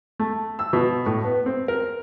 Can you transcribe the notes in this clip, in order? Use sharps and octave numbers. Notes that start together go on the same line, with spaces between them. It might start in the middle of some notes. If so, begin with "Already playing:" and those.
A3
E6
B2
A2
B3
C4
A#4